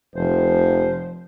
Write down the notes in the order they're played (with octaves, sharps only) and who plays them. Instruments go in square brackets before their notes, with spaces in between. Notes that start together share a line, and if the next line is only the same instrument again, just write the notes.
[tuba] F1 [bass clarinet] F3 [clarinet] C5